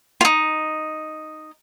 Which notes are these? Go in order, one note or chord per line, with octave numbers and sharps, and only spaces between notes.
D#4 F4